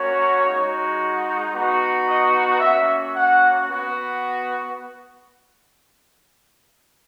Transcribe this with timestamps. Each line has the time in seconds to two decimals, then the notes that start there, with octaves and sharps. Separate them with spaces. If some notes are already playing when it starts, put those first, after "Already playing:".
Already playing: A#3 C#4 F#4 C#5
0.46 G#3 D#4 F#4
1.53 B3 D#4 F#4
2.07 D#5
2.60 A#3 C#4 F#4 E5
3.14 F#5
3.67 B3 F#4